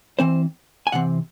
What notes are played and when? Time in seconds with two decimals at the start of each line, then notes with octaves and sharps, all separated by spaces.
0.19 E3 C4 C5
0.87 G#5
0.92 C3 E3 C4 F#5